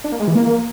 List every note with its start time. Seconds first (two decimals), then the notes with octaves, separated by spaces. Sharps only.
0.04 D4
0.12 A#3
0.20 G#3
0.28 E3
0.35 A#3